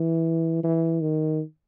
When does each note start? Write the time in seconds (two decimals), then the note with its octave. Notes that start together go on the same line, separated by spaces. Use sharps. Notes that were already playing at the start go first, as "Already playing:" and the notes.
Already playing: E3
0.63 E3
1.01 D#3